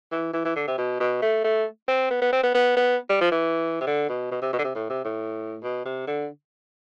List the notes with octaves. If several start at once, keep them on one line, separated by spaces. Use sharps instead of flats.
E3
E3
E3
D3
C3
B2
B2
A3
A3
C4
B3
B3
C4
B3
B3
B3
G3
F3
E3
C3
D3
B2
B2
C3
B2
D3
C3
A2
C3
A2
B2
C3
D3